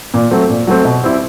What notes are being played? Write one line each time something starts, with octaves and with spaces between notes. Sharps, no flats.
A#2
F#3 A3 C4
A#2
F#3 A3 C4
B2
G3 C4 E4